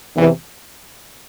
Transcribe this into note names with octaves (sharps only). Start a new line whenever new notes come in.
E2 C3 E3